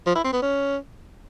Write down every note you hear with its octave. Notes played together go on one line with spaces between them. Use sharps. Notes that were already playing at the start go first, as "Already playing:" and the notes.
F3
E4
C4
B3
C#4